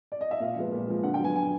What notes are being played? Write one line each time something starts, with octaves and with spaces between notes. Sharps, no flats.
D5
D#5
E5
A#2 F5
F3 G#3 B3
A#2
F3 G#3 B3
D3 F#5
G5
F#3 B3 G#5
D3 G#5